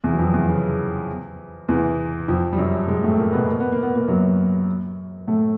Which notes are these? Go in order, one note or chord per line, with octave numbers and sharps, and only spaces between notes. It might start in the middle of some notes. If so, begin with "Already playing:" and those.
E2 E3
F#3
F2 F3
E2 E3
C#3
E2 E3
F2 F3
G3
F#2 F#3
G#2 G#3
A2 A3
A#2 A#3
B2 B3
A#3
B3
A#3
B3
A#2 A#3
F#2 F#3
A2 A3